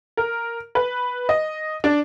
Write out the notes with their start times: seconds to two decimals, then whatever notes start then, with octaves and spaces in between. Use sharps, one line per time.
0.17 A#4
0.75 B4
1.29 D#5
1.84 D4